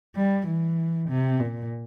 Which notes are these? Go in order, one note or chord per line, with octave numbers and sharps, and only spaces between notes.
G3
E3
C3
A#2